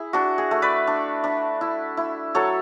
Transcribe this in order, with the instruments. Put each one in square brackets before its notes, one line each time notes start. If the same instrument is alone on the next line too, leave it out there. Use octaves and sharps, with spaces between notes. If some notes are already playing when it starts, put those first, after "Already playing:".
Already playing: [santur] E4 G#4
D4 F#4
G#4
A3
B4 D5
D4
D4
E4
E4
F#3 A4 C#5